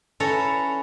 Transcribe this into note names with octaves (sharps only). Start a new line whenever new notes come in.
C#4 E4 A4 B4 C#5 A#5